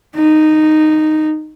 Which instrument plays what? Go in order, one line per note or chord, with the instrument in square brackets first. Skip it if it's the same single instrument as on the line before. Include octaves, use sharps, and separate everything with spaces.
[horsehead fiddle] D#4